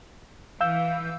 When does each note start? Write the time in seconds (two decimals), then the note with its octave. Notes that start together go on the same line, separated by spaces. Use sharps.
0.61 E3 F5 E6 G6